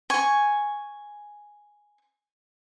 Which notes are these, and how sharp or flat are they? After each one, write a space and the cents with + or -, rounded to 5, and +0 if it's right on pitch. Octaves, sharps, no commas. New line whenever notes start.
G#5 +0 C#6 +0